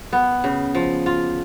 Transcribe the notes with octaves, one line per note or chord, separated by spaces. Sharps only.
B3
C#3
F3
F4